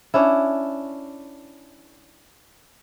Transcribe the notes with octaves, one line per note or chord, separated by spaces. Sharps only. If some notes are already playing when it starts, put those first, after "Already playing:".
C#4 D4 E4